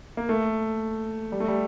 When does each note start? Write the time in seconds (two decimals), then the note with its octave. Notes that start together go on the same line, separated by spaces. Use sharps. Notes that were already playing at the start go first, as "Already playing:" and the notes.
0.17 A#3
0.29 A3
1.32 G3
1.40 A3
1.48 G3